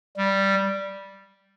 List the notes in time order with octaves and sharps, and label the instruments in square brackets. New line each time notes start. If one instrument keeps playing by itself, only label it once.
[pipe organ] G3